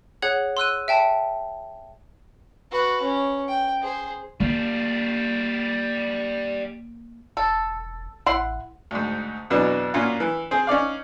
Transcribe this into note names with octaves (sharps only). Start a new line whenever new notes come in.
G#4 C#5 F#5 F#6 G#6 F#7
C6 E6 F#6 D#7
E5 G5 A5
F#4 B4
C#4
G5
G#4 C5
G3 A#3 F4
E1 A4
A1 E4 F#5 C6
D2 G#2
F2 B2 E3 F#3 B3 D4
A#2 A#3 C#4 F4 F#4
E3
C4 G#4
C#4 D#4 D5 F5